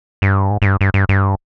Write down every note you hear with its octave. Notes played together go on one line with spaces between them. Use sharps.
G2
G#2
G#2
G2
G2
G2
G2